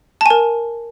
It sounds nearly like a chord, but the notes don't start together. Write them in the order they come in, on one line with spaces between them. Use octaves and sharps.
A5 G#5 A#4